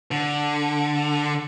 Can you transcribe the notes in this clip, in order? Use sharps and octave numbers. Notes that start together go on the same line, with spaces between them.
D3